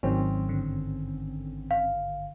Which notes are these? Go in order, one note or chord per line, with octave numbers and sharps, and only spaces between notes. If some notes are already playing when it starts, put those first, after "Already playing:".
G#1 G#2 D#3 F#3 C4 C#4
G2 D3
F5